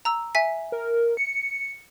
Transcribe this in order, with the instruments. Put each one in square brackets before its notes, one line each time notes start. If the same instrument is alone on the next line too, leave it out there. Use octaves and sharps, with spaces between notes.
[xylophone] A#5 E6
E5 G#5 B6
[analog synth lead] A#4
C#7